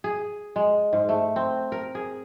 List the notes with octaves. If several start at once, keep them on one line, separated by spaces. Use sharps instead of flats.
G#4
G#3
G#2
A3
C4
A#4
G#4